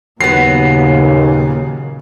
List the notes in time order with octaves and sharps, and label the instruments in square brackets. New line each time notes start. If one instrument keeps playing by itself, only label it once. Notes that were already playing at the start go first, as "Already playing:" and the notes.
[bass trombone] D#2 [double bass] A#2 C#3 [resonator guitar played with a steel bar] F#3 B3 [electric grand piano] C7